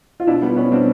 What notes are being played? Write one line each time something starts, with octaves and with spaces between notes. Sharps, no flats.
F4
B2 D4 E4
G3 B3
B2 B3 C#4
G3 C4 D4